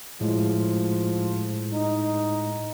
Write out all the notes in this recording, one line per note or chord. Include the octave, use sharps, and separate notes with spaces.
A2 F3 G#3
D#4